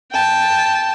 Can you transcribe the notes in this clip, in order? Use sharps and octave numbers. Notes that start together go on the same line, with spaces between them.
G5 A5